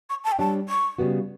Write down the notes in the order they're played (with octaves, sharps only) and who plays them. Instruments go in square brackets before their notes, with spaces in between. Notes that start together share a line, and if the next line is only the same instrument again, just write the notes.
[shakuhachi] C#6
A5
G5
[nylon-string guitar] G3 D4 G4 C#5 [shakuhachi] A5
[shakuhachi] C#6
[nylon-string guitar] C#3 G3 B3 F#4